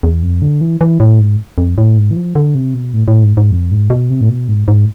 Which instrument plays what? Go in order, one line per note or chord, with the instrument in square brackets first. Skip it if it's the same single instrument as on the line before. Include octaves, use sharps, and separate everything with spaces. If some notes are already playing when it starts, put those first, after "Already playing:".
[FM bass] E2
F2
D3
E3
E3
A2
G#2
F2
A2
G#2
E3
F3
D3
C3
B2
A2
A2
G#2
G#2
F2
G#2
B2
C3
A2
B2
G#2
G#2